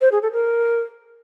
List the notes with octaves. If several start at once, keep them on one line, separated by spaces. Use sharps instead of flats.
C5
G#4
A4
A#4